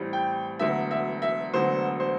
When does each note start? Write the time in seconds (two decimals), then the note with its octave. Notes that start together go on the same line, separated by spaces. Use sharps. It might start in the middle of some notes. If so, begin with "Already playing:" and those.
Already playing: A1 A2 G3 C4
0.13 G5
0.59 E1 D2 D3 F#3 B3 E5
0.91 E5
1.22 E5
1.53 E1 D2 D3 F#3 B3 C5
2.00 C5